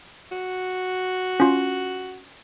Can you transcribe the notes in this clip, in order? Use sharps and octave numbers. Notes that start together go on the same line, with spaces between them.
F#4
C#4 F4